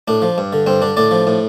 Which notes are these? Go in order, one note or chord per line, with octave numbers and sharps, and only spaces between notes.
A2 D4
F3
G2
D3
G2 C4
D3 D4
A2 D4 D5
F3
A2